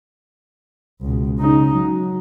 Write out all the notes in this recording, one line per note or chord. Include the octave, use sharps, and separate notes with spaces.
C#2 B2
C#3 D#4
F#3